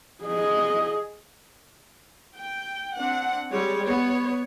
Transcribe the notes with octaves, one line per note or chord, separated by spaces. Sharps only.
G#4 D#5
G5
C4 D4 F#5
G3 G#3 C#5 D5
B3 C#5